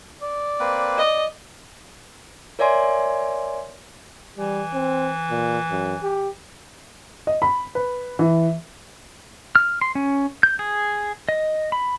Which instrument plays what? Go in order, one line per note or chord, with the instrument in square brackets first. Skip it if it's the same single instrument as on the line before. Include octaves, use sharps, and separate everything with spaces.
[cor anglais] D5
[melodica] A#3 C4 B4
[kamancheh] D#5
[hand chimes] A#4 C#5 D5 E5 G#5 C6
[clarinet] E3 [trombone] G3
[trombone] C4
A#2
F#2
G4
[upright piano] D#5
B5
B4
E3
[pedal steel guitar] F6
C6
C#4
G6
G#4
D#5
B5